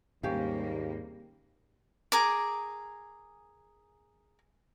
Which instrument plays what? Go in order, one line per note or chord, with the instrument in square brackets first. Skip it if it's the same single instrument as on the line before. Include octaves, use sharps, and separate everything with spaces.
[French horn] D#2 [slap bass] G#2 [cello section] C3 G3 A#3 [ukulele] C#4 G4 F5
[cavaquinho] G#4 A#4 D6